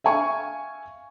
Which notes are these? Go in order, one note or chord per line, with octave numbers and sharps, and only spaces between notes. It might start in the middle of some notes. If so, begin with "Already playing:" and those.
E5 F5 G#5 C#6